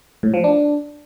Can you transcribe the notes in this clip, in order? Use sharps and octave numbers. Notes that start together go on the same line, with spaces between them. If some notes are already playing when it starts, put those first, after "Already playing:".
A2
F3
D4